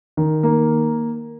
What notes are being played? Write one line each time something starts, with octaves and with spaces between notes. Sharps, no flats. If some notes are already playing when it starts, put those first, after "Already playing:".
D#3
A#3